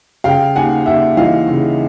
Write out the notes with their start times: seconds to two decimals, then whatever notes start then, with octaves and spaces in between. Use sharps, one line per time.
0.24 C#3 F5 G5
0.56 D#2 F#5 G#5
0.86 D#2 E5 F#5
1.17 E3 D#5 F5
1.48 C#3